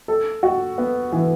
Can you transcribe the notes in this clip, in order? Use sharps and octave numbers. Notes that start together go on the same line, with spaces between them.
A4
F#4
B3
E3